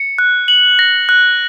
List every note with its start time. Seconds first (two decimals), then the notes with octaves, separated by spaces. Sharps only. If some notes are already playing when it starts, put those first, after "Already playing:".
Already playing: C#7
0.18 F#6
0.48 F#7
0.79 A#6
1.09 F#6